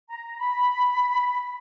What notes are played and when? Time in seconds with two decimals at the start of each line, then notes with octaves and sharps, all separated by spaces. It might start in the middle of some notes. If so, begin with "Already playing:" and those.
0.10 A#5
0.39 B5